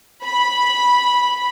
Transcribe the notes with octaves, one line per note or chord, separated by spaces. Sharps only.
B5